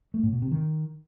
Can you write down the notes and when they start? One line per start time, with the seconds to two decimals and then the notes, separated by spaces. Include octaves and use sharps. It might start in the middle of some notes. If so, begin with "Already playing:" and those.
0.14 A3
0.23 A2
0.33 B2
0.42 C3
0.52 D#3